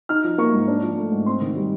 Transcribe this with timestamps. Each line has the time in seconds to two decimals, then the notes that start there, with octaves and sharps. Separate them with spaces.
0.09 D#4 F6
0.24 F3
0.38 A#3 C#6
0.53 G#2
0.68 D4
0.82 F3
0.97 A3
1.12 G#2
1.26 C4 C6
1.41 D#3
1.56 G3